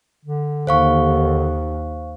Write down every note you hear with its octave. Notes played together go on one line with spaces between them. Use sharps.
D3
D#2 C5 F5 C#6